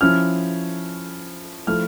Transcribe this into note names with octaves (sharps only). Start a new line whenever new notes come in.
F3 C#4 E4 F6
F3 A3 E4 F6